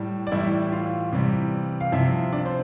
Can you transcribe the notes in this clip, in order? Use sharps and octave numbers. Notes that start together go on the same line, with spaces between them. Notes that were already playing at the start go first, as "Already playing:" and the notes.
Already playing: A2 G3
D5
A2 E3 G3 E4 E5
F4 F5
C3 E3 G3
F5
C3 F3 E4 E5
D4 D5
C5